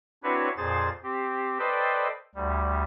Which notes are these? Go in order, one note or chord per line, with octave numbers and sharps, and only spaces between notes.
C4 D4 E4 F#4 B4 C#5
F2 A#2 G#4 C5 A6
C4 G4
A4 B4 C5 D5 D#5 G5
D2 G3